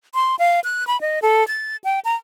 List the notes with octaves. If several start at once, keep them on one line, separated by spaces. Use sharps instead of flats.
C6
F5
F#6
B5
D#5
A4
A6
G5
A#5